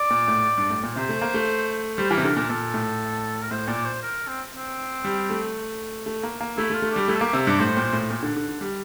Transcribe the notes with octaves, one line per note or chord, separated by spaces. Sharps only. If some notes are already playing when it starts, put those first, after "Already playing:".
Already playing: D5
A#2
A2
G2
A2
A#2
C3 C5
A3
A#3
A3
G3 C5
E3 A#4
C3
D3 A#4
A#2 A#4
A#2 A4
A2
A#4
A2 C5
A#2 D5
C5
A#4
C4
C4
G3
A3
A3
A#3
A#3
A3 E4
A3
F4
A3
G3 D4
A3 E4
A4
A#3 G4
C3 E5
G2 D5
A2 C5
A#2
A2
A#2
D3
D3
D3
G3